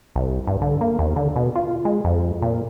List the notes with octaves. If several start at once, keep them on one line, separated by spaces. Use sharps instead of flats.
C2
G2
D3
A#3
D#2
D3
B2
F4
G#3
F2
A#2